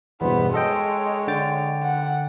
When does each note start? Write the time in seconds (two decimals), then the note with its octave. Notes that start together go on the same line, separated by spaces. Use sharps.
0.21 E2 G2 B2 B3 C5
0.54 G#3 A4 C#5 D#5 G5
1.28 D3 G5 A6
1.83 F#5